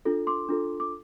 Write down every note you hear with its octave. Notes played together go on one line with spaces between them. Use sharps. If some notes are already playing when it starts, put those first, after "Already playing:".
D4 F4 A4
C6 D6
D4 F4 A4
D6